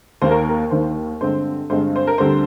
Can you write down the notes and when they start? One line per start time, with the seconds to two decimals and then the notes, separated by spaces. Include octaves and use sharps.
0.22 D#2 D#3 A#3 C5
0.31 A#4
0.49 A#4
0.71 D#2 D#3 A#3 C5
1.21 G2 D3 G#3 C4 C5
1.70 G2 D3 G#3 C4 C5
1.96 C5
2.07 A#4
2.18 D2 D3 G3 C4 C5